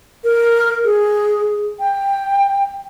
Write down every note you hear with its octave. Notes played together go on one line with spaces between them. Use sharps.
A#4
G#4
G5